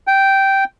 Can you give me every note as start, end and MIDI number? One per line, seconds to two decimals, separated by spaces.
0.07 0.64 79